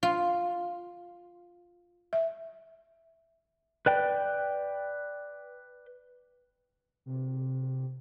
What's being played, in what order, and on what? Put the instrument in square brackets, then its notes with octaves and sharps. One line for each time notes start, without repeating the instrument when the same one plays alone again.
[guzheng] F4
[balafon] E5
[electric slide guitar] B4 D5 G5
[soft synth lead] C3